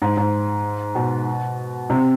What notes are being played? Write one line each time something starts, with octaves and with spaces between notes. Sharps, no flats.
G#2
G#2
B2
C3